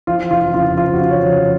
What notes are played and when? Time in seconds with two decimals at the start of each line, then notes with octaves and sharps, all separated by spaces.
0.07 F3 F4
0.31 F1 F4
0.54 C#3 F4
0.77 F3 F4
0.94 F#4
1.00 C#3
1.11 C#5
1.23 F1
1.29 C#5